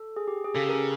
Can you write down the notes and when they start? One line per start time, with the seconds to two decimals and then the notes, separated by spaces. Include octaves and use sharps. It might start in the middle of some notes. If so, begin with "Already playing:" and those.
Already playing: A4
0.16 G#4
0.28 G4
0.44 G#4
0.55 C#3 G4 A4
0.69 G#4 A#4